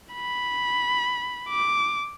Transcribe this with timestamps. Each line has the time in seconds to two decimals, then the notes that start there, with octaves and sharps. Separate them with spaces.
0.14 B5
1.49 D6